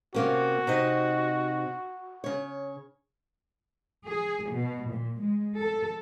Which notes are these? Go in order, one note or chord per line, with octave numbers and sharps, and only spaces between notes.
C3 A#3 C#4 F#4
C3 D#4 D#5
C#3 C#5
G#4
B2
A#2
G#3
A4